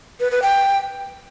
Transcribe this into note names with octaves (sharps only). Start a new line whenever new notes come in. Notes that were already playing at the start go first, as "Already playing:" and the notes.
B4
B4
G5